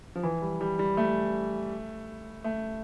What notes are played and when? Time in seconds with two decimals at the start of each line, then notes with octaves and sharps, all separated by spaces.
0.16 F3
0.23 E3
0.42 G3
0.61 G3
0.79 G3
0.97 A3
2.44 A3